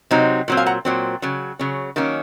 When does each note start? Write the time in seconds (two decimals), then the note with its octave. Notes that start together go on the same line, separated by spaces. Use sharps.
0.11 C3 F#3 C4 D#4
0.48 A#2 F#3 C4
0.57 F5 G#5
0.66 F#5 A#5
0.85 A#2 F#3 C4
1.22 C#3 F#3
1.59 C#3 F#3 C#4
1.96 D#3 F#3 A#3 C#4